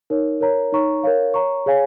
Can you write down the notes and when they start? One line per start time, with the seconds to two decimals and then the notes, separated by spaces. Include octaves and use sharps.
0.10 D#4 A#4 C#5
0.41 A#4 C#5 A#5
0.72 D#4 C#5 A#5 C#6
1.03 A#4 C#5 F5
1.34 C#5 A#5 C#6
1.66 G#4 C#5 F5 G#5